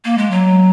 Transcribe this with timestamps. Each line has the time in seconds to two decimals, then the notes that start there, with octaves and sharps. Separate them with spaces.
0.05 A#3
0.18 G#3
0.31 F#3